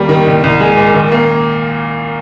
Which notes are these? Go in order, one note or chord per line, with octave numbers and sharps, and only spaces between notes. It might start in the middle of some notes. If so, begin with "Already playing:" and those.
Already playing: D#2 G3 A#3
D#3
C2
C2
G#3
A#2
D#2
A#3